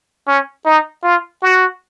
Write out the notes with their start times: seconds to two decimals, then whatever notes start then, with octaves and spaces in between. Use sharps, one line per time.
0.28 C#4
0.66 D#4
1.04 F4
1.42 F#4